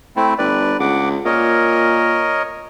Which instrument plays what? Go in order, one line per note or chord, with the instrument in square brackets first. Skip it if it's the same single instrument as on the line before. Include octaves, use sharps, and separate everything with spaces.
[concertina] A3 C4 E4
[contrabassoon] G1 [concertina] B4 D5
[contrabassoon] C#2 [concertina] F#5 D6
[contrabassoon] A#2 [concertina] A#4 C#5 D#5